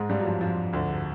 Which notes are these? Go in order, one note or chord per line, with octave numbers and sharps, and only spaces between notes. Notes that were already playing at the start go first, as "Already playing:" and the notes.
Already playing: G#2 G#3
G2 G3
F#3
F2 F3
F2 F3
D2 D3